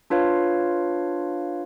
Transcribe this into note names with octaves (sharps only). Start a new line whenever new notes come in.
D4 F4 B4 C#5 F5